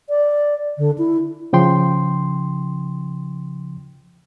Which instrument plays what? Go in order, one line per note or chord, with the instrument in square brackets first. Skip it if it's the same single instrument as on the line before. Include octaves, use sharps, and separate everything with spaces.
[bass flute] D5
D3
E4
[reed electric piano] C#3 F3 G5 C6